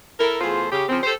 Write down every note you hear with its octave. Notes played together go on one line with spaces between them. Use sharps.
E4 A4 A#4
E2 A3 F4 G#4 C5
C#3 G4
C#3 F3 C4
G4 A4 C5